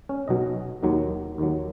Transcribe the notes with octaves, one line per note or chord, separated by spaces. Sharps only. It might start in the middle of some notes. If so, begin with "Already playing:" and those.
C#4
B1 B2 F#3 D#5
D#2 D#3 F#3
D#2 D#3 F#3